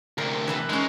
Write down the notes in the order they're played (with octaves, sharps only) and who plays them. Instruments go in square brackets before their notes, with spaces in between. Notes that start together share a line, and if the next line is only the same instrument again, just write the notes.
[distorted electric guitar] D2 C3 [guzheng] A#4
[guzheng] E3 E4 B4
[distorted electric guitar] E3 G#3 [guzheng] C#4 D#4